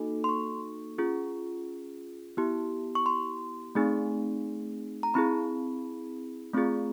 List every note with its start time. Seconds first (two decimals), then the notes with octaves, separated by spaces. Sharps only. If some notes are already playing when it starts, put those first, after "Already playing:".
Already playing: A#3 D#4 F#4 A4
0.24 C6
0.29 C#6
0.98 C#4 F4 G#4
2.37 B3 E4 G4
2.95 C#6
3.06 C6
3.75 A3 C4 D#4 G#4
5.03 A#5
5.14 C4 E4 G#4 B5
6.53 A3 C4 F4 G#4